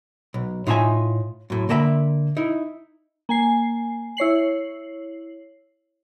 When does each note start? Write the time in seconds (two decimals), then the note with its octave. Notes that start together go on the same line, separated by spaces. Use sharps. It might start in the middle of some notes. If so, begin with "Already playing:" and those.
0.34 B1
0.67 A2 D#4 F4 C#5 E5 G#5
1.50 F#2 A2
1.69 D3 A#3 A#4 E5 G5 B5
2.37 D#4 E4
3.29 A#3 G#5 C7
4.17 E4 C#5 C7 F#7